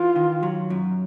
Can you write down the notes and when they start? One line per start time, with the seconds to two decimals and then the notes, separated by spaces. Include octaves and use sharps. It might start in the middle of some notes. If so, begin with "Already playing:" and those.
Already playing: E3 F4
0.16 D#3
0.43 F#3
0.70 F#2